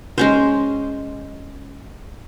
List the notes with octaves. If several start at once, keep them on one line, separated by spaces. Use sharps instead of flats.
G#3 C#4 C5